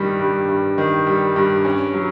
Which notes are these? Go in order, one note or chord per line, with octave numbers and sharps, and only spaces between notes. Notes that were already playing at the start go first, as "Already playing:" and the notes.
Already playing: G2 D#3 G3
G2
G2
D#3
G3
G2
C#4
F#3